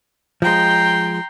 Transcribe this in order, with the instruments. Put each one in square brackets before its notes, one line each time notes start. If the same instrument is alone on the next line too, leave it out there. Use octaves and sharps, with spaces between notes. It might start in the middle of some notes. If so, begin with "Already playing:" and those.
[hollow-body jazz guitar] F3 G#3 [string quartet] G5 A#5 C6